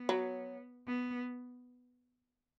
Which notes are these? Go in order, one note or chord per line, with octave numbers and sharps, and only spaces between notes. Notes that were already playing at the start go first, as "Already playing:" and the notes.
Already playing: B3
F#3
B3